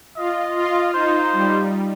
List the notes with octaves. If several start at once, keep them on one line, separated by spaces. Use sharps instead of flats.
F4 D#5
F4
D#4 C5
G3